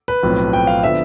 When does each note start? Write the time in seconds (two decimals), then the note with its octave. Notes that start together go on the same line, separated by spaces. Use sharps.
0.08 B4
0.23 B1 A2 F3 C4
0.53 G5
0.67 F5
0.83 D3 F3 B3 D4 E5